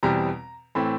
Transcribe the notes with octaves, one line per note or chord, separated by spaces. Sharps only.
E2 B2 G3 C4 A#5
A2 E3 A3 C4 B5